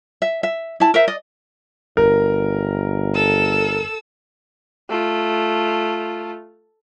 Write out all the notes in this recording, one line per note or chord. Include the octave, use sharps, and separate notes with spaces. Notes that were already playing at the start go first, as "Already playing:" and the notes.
E5
E5
E4 A5
A#4 C5 E5
D5 D#5
G1 A#4
A4 E6
A3 F4